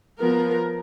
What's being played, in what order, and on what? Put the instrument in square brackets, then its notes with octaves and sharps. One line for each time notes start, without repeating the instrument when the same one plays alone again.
[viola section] F3 B3 A#4